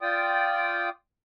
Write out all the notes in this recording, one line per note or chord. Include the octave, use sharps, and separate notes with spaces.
F4 D5 G5 D#6